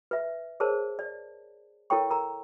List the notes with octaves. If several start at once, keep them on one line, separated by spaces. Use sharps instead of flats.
B4 E5
G#4 A#4 C5 C#5 A5
D5
E4 A4 A#4 C#5 G5 C#6
A#4 A#5